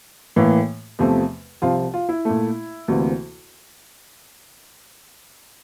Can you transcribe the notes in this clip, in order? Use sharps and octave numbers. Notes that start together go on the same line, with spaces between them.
A2 E3 A#3
E2 C3 F3 A3
C2 C3 F3 F4
F4
E4
A#2 A3
D2 C3 E3 A#3